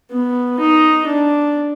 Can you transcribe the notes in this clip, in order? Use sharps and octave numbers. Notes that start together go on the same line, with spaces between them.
B3
D#4
D4